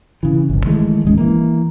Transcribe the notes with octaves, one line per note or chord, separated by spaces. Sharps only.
C#3 E3
G1 C2
D#3 E3 G#3 A3
D1 G#3 C#4
E3 A#3